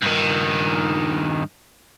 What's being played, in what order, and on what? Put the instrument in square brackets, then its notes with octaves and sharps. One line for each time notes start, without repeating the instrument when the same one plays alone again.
[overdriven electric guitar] G2 D#3